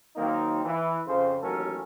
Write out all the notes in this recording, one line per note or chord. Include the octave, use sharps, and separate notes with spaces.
D#3 F#3 A#3 C4 D#4
E3
F2 C#3 C5
A1 D#2 F#3 C#4 A4 A#4